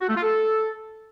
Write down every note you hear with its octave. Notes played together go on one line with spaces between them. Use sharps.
F#4
A3
F4
A4